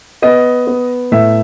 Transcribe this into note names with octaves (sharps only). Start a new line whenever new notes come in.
B3 D#5
B3
A2 E5